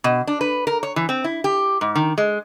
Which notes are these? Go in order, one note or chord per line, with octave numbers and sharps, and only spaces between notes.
B2
D4
B4
A#4
C#5
E3
C4
E4
G4
G#2
D#3
G#3